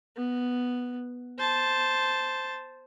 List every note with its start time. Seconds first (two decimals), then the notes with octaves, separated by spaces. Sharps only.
0.16 B3
1.38 C5 A5